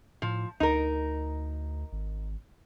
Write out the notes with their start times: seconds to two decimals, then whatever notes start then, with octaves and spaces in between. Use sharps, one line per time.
0.22 A2 F3
0.60 D2 D#4 A#4
1.92 G#1